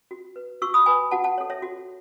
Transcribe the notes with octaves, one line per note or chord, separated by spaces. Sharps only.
F#4
B4
F#4 C#6 E6
B5 D#6
B4 G#5 B5
F#4 F#5 A5
F#5 A5
A4 C#5
C#5 E5
F#4